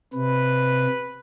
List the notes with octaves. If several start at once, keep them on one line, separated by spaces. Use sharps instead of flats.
C3 B4